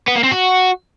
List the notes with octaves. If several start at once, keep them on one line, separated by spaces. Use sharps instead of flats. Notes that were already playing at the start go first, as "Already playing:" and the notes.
B3
A#3
C4
F#4